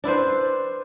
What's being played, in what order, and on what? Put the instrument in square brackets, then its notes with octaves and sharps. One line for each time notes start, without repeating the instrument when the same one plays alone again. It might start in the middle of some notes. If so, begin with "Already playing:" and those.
[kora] D4 E4 B4 C5